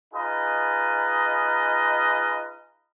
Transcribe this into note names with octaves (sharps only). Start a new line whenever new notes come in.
D#4 F4 G#4 B4 D#5